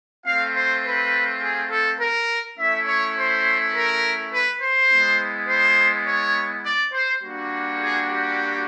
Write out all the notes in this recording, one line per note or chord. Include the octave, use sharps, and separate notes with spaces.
A3 C4 F4 F5
C5
B4
G#4
A4
A#4
A3 C#4 E4 E5
C#5
C5
A#4
B4
C5
G#3 B3 E4
C5
C#5
D5
C5
G3 A#3 D4 F#4
G#4
G4